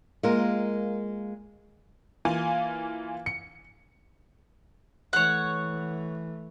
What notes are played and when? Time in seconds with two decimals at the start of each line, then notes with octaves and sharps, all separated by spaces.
0.23 G#3 A#3 F4 A#4
2.25 E3 A#3 F4 G#5
3.26 C#7
5.13 E3 A3 C#5 F#5